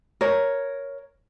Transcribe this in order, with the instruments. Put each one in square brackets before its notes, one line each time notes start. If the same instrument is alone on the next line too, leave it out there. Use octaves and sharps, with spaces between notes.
[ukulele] A#4 C#5